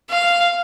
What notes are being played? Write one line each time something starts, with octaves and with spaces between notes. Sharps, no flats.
F5